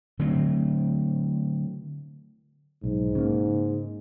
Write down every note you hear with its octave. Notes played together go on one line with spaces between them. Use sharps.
D3 F#3 A3 C4
B1 G#2
C#3 A#3